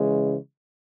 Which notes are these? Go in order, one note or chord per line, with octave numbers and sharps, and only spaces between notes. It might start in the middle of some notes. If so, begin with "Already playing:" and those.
Already playing: C#3 E3 G#3